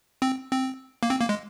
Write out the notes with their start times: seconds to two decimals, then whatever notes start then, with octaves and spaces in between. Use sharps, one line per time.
0.22 C4
0.51 C4
1.03 A#3
1.10 C4
1.20 A#3
1.29 G#3